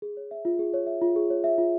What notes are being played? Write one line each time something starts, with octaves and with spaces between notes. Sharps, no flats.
G#4
C#5
E5
F4
G#4
C#5
E5
F4
G#4
C#5
E5
F4